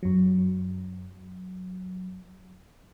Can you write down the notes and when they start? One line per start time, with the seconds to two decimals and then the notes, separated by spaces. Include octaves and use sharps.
0.03 F#2 F#3